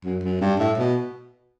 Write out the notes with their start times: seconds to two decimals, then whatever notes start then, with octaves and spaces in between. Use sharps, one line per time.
0.05 F#2
0.24 F#2
0.41 G2
0.60 A2
0.78 B2